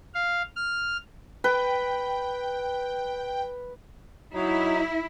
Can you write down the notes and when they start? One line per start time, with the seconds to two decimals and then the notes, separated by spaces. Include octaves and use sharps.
0.14 F5
0.56 F6
1.44 B4 G5
4.34 F#3 D#4 E4